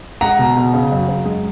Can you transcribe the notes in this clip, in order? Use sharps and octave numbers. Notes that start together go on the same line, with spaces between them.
G#3 F#5 A#5
B2
B2
C#3
F#2
F#2
G#3